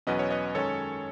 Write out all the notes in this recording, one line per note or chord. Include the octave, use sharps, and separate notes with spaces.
E2 B2 F#3 C#4 B4 D#5
C#5
B4 D#5
F#2 D#3 G#3 C#4 A4 C#5